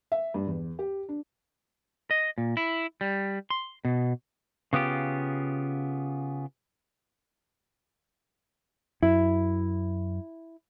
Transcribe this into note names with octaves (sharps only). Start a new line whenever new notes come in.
E5
G2
E2
G4
D4
D#5
A#2
E4
G3
C6
B2
C#3 B3 F4 G4
F#2 E4